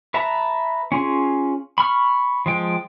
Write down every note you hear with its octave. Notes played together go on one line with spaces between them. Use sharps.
B4 E5 A5 A#5
C#4 F4 G#4
B5 C#6 F6
F3 G#3 G5